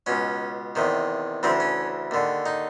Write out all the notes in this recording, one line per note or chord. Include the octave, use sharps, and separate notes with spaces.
C#2 B2 C#4
E2 C3 D#3
D2 C#3 E3 C4
C#4
D#2 D3
D#4